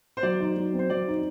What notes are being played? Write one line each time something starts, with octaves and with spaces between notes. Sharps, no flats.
C5
F#3 D5
D#4
F#3
C4
C5
F#3 D5
D#4